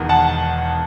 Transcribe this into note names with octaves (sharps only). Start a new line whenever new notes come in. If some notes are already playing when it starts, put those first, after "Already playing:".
Already playing: E1 E2 D#3
F#5 A5